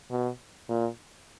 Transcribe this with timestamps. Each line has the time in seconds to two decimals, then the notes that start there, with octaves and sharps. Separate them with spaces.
0.11 B2
0.69 A#2